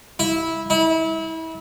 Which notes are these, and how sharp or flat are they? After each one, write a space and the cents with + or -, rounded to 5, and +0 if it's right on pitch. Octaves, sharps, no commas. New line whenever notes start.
E4 -15
E4 -30